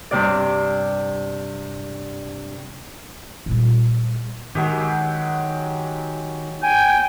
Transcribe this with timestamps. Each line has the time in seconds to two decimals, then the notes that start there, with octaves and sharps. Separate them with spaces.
0.11 G2 C3 D5
3.46 A#2 G3
4.55 D#3 F#3 G#3 G4
6.63 G5 G#5